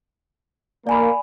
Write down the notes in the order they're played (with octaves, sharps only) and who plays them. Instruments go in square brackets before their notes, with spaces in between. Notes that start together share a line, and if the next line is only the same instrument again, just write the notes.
[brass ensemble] A#3 [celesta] D5 G#5 B5